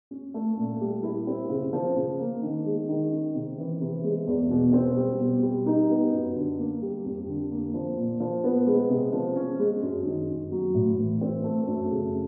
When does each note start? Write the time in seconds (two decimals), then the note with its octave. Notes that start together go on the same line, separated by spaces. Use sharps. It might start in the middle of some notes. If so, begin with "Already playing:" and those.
0.11 C#4
0.34 A3
0.57 A#2
0.81 G3
1.03 E4
1.27 C4
1.49 C#3
1.73 F3
1.96 C#3
2.20 A#3
2.42 D#3
2.65 G#3
2.89 D#3
3.12 C#4
3.35 C3
3.58 E3
3.81 C3
4.04 G#3
4.27 E2
4.50 B2
4.73 C4
4.97 G3
5.19 B2
5.43 G3
5.66 D#4
5.90 B3
6.13 F#2
6.36 D3
6.58 A#3
6.82 G3
7.05 F2
7.28 D3
7.51 A#3
7.74 F3
7.97 A#2
8.20 F3
8.44 B3
8.67 G#3
8.90 C3
9.13 F3
9.36 C#4
9.59 G#3
9.82 F#2
10.05 D#3
10.29 F#2
10.52 F#3
10.74 A2
10.98 E3
11.21 C4
11.44 A3
11.67 F#2
11.91 C#3